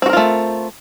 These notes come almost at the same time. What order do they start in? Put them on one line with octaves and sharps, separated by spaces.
C4 F#4 A#4 F4 A3